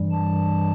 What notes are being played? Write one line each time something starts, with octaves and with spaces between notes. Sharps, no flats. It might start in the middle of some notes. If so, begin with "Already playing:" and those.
Already playing: G2 E3 G3
A5